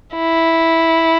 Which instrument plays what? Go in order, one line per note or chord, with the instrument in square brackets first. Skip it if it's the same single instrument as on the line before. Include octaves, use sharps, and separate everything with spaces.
[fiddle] E4